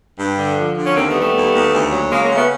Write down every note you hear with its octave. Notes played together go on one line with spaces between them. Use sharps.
G2
D3
F3
D3
C#4
D#2 A#3 C4
A3 B3
G3
A3 B3
D#2
D#2
D2
F#3
C#3 G#3 A#3
G#3 A#3
C#3
A3 B3